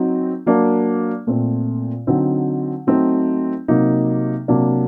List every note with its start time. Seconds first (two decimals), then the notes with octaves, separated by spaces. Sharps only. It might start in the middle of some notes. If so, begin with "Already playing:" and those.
Already playing: F#3 C4 D#4
0.46 F#3 A#3 D4
1.27 A#2 A3 C4
2.07 D3 F#3 C4 D#4
2.87 F#3 A3 C4 D#4
3.68 C3 F#3 A#3 D#4
4.48 C3 F#3 A#3 D4